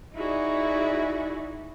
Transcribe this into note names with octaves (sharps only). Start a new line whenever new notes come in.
D#4 E4 F#4 G#4 D5